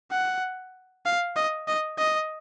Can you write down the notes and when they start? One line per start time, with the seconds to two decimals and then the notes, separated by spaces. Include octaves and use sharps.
0.11 F#5
1.06 F5
1.36 D#5
1.68 D#5
1.98 D#5